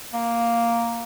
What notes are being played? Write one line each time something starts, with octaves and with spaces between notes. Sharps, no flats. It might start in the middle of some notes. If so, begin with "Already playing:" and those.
A#3